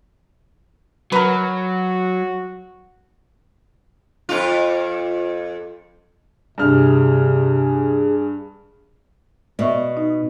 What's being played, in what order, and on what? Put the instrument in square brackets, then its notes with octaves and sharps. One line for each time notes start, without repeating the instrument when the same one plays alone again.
[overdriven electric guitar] F#3 [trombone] F#4 [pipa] A#4 B4
[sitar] F2 F4
[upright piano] G2 F6 [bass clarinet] C3 [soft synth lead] G#4
[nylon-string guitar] B2 [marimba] D5 E5 C#6
[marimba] D#4